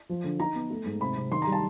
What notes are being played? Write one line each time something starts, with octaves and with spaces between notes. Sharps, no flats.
F3
D3
D#4 A#5
B3
A3
G#2
C3 B5
C3
D#3 C6
G3 A#5
A5